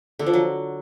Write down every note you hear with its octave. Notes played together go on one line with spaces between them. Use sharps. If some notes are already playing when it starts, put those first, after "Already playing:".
D3
F3
F#3